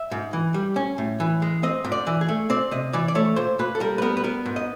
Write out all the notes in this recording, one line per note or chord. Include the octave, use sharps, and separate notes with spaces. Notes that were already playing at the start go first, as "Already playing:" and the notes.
Already playing: E5
G#2
E3
G3
C#4
A2
E3
G#3
C4 D#5
G#2
D5
E3
G#4
A3
C4 D5
C3 D#5
E3 D5
D5
A3 C#5
A#2 C5
A#2 B4
A4
G3 A#4
B4
B3 A#4
B4
B3 A#4
G#2
D#5